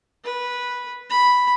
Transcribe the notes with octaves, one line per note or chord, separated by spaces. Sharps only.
B4
B5